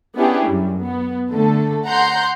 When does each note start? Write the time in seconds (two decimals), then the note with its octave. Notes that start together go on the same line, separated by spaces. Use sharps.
0.16 B3 C#4 D4 E4 G4 G#4
0.48 F#2 G3
0.81 B3
1.31 D3 A3 A4
1.87 F#5 A#5 C6 G6